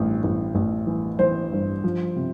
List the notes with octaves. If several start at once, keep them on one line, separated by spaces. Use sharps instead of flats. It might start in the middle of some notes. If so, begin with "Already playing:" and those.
Already playing: A1 G2
A1
A1
E3
E3 C5
G2
F3
C3